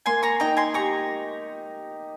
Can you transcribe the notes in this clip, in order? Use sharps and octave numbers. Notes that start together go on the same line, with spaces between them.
A#3 G#5 C6
A#5 C#6
D#4 G5 A#5
G#5 C6
G4 A#5 C#6